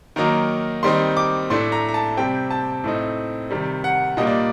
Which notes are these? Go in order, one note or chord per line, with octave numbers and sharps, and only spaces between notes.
D#3 F#3 A#3 D#4 A#5
D#3 G3 C4 D#4 C6
D6
A2 A3 D4 C6
A#5
A#5
A5
C3 G3 C4 G5
A5
A2 A3 C4 D#4
C3 D#3 G3
F#5
A#2 G3 A#3 D4 D#5
D5